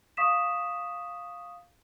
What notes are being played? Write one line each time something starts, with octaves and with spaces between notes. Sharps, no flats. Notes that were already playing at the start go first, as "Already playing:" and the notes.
F5 C#6 D#6 B6 E7